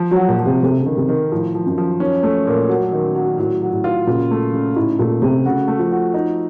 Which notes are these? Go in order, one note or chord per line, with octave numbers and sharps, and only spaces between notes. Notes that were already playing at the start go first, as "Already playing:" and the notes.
Already playing: F3
F#3
F#4
A#2
F3
C3
C3 A4
C#3
D#3
C3
D#3
A2 F3
F3
F#2
F3
C#4
A3
A#2
F#3
D#3
F#3
A2 F#3
F#3
A2
F4
A#2 C#3
A3
C#3
A2 D#4
A#2 A3
C3 A3
C#3 F#4
A3
F3
F#4
D#4